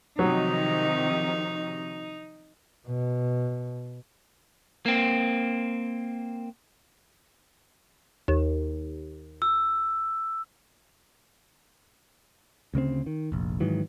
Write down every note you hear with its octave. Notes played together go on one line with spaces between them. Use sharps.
C3 D#3 F3 F#3 D#4
B2
A#3 C4
D#2
E6
D2 C#3 A#3 C4
D#3
F1 A#1
G#2 D#3 E3 F#3